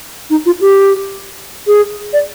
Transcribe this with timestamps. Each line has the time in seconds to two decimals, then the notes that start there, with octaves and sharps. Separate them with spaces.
0.30 D#4
0.46 F4
0.61 G4
1.67 G#4
2.13 D5